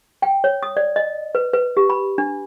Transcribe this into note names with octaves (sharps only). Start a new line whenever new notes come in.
G5
C#5
D#6
D5
D#5
B4
B4
G4
B5
D4